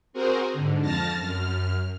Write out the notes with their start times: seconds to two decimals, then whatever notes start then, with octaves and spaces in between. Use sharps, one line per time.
0.13 C4 F#4 G#4 A#4 C5
0.53 G#2 D3
0.82 F2 A5 F6 A6 A#6
1.19 F#2 F6